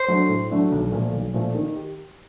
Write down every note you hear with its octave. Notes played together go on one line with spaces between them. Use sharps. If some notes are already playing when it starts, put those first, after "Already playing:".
Already playing: C5
F#3 A3 D4
A2
F#3 A3 D4
B1
A#2 F3 A3
B1
A#2 F3 A3
D#3
G4